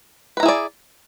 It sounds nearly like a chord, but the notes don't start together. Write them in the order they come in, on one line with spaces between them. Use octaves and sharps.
B4 A#5 E4 G#4 D5